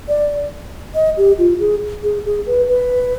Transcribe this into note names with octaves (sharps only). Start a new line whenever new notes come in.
D5
D#5
G4
F4
G#4
G#4
G#4
B4
B4